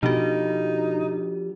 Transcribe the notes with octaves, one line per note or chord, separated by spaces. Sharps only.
B2 F3 D4 D#4 F#4 G4 A4